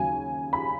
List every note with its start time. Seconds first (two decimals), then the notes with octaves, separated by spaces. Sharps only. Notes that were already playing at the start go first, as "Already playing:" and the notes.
Already playing: D#2 C#3 F#3 G#5
0.53 B5